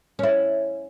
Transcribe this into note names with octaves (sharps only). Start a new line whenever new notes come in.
C#4 E4